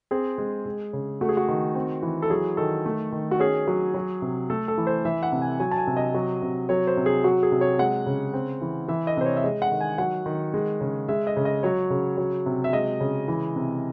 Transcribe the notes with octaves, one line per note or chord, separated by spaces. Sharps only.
C4 G#4
G#3
G#3
C#3
A3 F#4
G#4
F#4
D#3
C4
E3
A4
F#3 G#4
D#3 A4
A3
D#3
F#4
C#4 G#4
F#3
F#3
C3
A3 A4
A4
E3
C5
E3 E5
F#5
C3
G#5
F#3 G#5
A5
G#5
C3
D#5
F#3
C3
F#3 C#5
C5
C3
G#4
F#3 F#4
G#4
C3
C#5
G#3 F#5
C#3
C4
E3
E3 E5
D#5
C3 C5
C#5
E5
G#3 D#5
F#5
D#3
G#5
F#3 F#5
D#3
G#3
C#3
G#3 E5
D#5
C#3
D#5
F#3 C#5
C#3
F#3
C3
E5
G#3 D#5
C#3
E3
C3